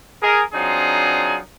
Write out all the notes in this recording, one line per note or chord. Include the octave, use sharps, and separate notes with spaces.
G#4 A#4
F#3 C4 D4 D#4 F4 G#4